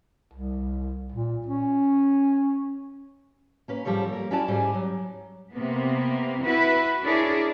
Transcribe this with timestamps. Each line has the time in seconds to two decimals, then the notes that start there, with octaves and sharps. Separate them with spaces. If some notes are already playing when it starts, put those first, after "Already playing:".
0.34 C2
1.12 A#2
1.47 C#4
3.68 A#3 C#4 B4
3.85 G#2 F3 G3 A4 C#5
4.09 A#3 A#4
4.31 C#4 E4 F#4 A4 D5 A5
4.48 G#2 G3 G#5
4.75 F#3
5.53 C3 A#3 B3
6.42 E4 F#4 B4
7.03 D4 E4 G#4 A#4 C#5 D5